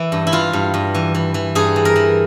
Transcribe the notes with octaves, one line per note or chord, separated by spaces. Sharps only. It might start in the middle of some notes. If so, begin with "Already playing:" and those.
Already playing: E3 E4
G2
E4
E3 F4
G2
G2
E3
E3
E3
G2 G#4
E3
A#4
E3